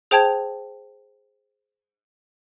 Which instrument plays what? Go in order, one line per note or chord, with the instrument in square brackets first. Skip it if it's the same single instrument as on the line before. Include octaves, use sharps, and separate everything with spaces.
[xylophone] G#4 C5 G5 A5 G#6 F7